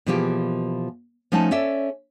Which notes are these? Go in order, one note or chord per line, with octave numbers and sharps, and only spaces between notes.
B2 E3 F3 A#3 G4 G#4
F3 A3 C#4 D#4 F#5 A5
C#4 A4 D5 E5